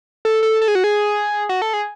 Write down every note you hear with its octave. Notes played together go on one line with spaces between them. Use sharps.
A4
A4
A4
G#4
F#4
G#4
F#4
A4
G#4